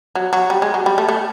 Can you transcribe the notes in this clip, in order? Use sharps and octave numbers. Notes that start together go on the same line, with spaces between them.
F#3
F#3
G3
G#3
F#3
G3
A3
A3